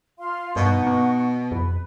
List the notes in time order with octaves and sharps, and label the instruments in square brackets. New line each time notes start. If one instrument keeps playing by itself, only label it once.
[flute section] F4 F5 C6
[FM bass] G2 [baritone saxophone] B2 [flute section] D#4 F#5 C#6
[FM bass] B3
[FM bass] F2 [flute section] B4